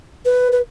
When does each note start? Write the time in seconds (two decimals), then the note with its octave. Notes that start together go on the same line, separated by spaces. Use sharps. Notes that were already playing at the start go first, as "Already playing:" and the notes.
0.26 B4
0.52 B4